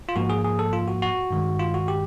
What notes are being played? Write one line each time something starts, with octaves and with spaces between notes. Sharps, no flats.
F4
G#2 F3 A#3 F#4
G#4
G#4
A4
F4
F#4
F#4
G2 D#3 G#3
F4
F#4
G4